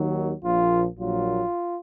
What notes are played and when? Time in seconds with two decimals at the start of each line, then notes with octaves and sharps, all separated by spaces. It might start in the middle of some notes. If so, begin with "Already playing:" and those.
Already playing: D#2 D#3 F#3
0.43 A#1 A#2 F3 F4
0.99 A#1 A#2 F#3 F4